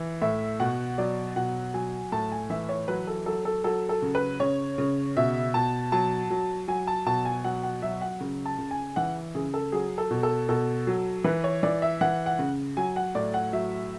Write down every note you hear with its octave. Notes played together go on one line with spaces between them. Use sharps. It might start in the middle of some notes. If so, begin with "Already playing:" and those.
Already playing: E3
A2 E5
B2 F#5
F#3 D5
B2 F#5
F#3 G#5
A2 A5
G#5
E3 E5
C#5
F#3 B4
A4
F#3 A4
A4
F#3 A4
A4
C#3
B4
C#3 C#5
C#3
B2 E5
B2 A5
F#3 A5
F#3
F#3 G#5
A5
B2 A5
G#5
F#3 F#5
F#5
F#3 E5
F#5
C#3
A5
C#3
G#5
E3 F#5
C#3 G#4
A4
F#3 G#4
A4
B2
A4
B2 A4
F#3
E3 B4
C#5
E3 D5
E5
E3 F#5
F#5
C#3
F#3 G#5
F#5
A2 D5
F#5
F#3 E5